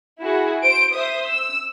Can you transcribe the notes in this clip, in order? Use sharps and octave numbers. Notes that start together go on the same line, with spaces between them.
E4 F#4 G#4
C5 D7
C5 E5 D#6
E6